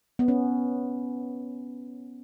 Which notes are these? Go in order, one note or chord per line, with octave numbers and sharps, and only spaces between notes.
B3
C#4